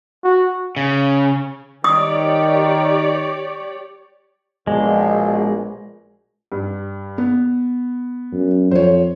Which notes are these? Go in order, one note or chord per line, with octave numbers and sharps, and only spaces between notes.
F#4
C#3
D#3 G4 C#5 D5 D#6
A#1 B2 G#3
G2
B3
F#2
F2 C5 C#5